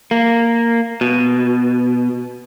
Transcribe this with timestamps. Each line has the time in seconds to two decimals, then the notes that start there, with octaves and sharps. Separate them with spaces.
0.11 A#3
1.01 B2